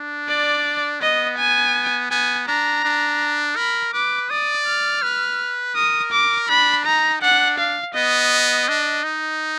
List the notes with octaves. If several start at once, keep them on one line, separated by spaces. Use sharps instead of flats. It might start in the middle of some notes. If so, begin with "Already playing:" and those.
Already playing: D4
D5
B3 D#5
G#5
B3 G#5
D4 A#5
D4
A#4 B5
B4 D6
D5 D#6
F6
B4
A#4 D#6
D6
D4 B5
D#4 A#5
D4 F#5
F5
B3 D#5
D4
D#4